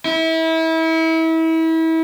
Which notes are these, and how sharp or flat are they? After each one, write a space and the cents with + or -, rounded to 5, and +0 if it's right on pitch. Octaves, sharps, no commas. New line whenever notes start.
E4 -30